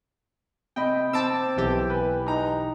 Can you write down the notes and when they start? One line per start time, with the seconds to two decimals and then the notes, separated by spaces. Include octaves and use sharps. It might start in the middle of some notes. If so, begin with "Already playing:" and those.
0.76 C3 D#5 G5 B5
1.13 C4 A5 D6 E6
1.57 B1 E3 G4
1.90 B4 G#5
2.26 D#4 A#5